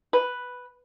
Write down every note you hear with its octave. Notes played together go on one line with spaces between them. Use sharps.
B4